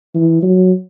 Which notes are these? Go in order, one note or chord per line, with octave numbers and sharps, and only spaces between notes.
E3
F#3